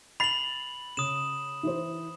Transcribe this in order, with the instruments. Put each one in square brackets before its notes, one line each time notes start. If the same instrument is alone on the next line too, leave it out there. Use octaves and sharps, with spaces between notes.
[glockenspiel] B5 F#7 [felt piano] A6 C7
[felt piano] C#3 [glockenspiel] D#6 E7
[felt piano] E3 C5